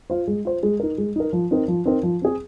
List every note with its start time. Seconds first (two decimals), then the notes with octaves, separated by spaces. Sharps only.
0.10 F4 C5
0.28 G#3
0.45 F4 C5
0.63 G#3
0.80 D#4 A#4
0.98 G#3
1.16 D#4 A#4
1.33 F3
1.51 C4 D#4 A#4
1.68 F3
1.86 C4 D#4 A#4
2.03 F3
2.22 C4 G#4